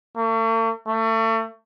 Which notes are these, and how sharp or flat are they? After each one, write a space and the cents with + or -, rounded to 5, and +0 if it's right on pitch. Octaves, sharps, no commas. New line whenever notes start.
A3 +45
A3 +35